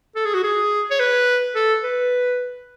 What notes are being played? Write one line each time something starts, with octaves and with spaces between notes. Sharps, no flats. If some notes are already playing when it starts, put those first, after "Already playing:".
A4
G#4
F#4
G#4
C#5
B4
A4
B4